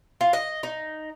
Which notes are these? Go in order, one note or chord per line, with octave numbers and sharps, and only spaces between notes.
F4
D#5
D#4